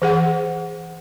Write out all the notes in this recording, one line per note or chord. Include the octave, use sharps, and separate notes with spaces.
E3 G#4 F#5